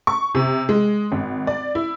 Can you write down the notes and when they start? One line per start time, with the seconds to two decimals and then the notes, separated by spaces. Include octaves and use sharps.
0.07 C#6
0.35 C3
0.69 G#3
1.12 G#1
1.47 D5
1.75 E4